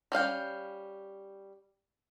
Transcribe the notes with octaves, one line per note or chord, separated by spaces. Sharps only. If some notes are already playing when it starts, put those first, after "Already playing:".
G3 C#4 F5 G5